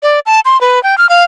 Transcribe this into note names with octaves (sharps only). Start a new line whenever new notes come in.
D5
A5
C6
B4
G5
F6
F5